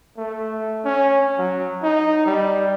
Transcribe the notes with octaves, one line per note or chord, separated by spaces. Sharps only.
A3
C#4
F#3
D#4
G3